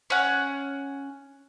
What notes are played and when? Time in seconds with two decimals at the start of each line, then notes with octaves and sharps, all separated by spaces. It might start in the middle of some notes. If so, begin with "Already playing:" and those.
0.10 C#4 F#5